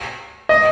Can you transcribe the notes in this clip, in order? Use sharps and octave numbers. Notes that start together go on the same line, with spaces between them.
D#5